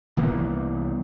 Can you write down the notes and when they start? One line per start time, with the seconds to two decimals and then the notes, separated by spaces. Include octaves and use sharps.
0.17 C2 E3 A#3 B3